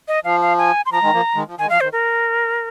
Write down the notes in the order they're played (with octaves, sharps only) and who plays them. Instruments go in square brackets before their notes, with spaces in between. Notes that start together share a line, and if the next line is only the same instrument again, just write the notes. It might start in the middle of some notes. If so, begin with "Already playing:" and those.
[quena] D#5
[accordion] F3 [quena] F5
[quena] F5
G#5
C6
[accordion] F3 [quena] A#5
[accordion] D#3 G#3
F3 A#3
D#3 G#3
F3
[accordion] D#3 [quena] G#5
[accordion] G#3
[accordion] F3 [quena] F5
[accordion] D#3 [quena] C5
[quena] A#4